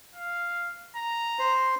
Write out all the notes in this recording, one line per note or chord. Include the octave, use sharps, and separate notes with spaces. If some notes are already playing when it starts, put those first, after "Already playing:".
F5
A#5
C5